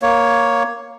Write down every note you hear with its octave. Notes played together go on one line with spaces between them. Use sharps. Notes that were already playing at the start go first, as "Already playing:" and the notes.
A#3 C#5